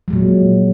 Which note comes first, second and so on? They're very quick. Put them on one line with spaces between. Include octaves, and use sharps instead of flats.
F#3 G#3 A#2